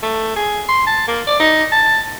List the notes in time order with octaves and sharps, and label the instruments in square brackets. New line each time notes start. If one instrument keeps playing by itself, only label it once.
[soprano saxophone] A3
G#4
C6
A5
A#3
D5
D#4
A5